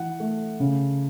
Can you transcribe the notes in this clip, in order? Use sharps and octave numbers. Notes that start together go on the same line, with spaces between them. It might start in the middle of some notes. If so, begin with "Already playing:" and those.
Already playing: E3 F#5
A3
C#3